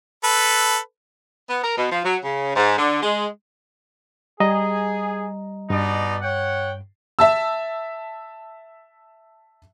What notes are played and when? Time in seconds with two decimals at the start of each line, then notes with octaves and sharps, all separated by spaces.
0.24 A4 B4
1.50 B3
1.63 A#4
1.78 B2
1.92 F3
2.05 F#3
2.24 C#3
2.56 G#2
2.78 D3
3.03 G#3
4.40 G3 G#4 D#5 A#5
5.70 G2 B2 D#4 D5
6.22 C#5 F#5 G5
7.19 E5 A5 E6